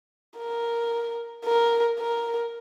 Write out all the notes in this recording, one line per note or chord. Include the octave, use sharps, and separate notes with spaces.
A#4
A#4
A#4